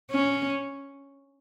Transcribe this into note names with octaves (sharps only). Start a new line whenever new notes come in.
C#4